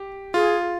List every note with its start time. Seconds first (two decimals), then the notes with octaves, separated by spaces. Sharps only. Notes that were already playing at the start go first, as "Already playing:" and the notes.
Already playing: G4
0.34 F4 G#4